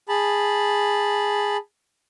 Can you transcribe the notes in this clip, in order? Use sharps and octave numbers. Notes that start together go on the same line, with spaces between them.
G#4 A5 B5